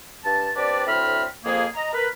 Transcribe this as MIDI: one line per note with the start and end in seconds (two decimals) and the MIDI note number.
0.24 0.50 43
0.24 0.50 81
0.56 0.83 60
0.56 0.83 62
0.56 0.83 67
0.56 0.83 71
0.56 0.83 74
0.87 1.24 38
0.87 1.24 45
0.87 1.24 60
0.87 1.24 76
0.87 1.24 83
0.87 1.24 89
1.44 1.66 41
1.44 1.66 58
1.44 1.66 68
1.75 1.91 75
1.75 1.91 82
1.93 2.07 70
1.93 2.07 71